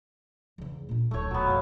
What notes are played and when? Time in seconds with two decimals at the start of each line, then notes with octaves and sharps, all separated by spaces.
0.58 E2 C#3
0.89 A#2 D4
1.11 D1 B1 A3 C#5
1.31 F#3 B3
1.46 F1 E2 F5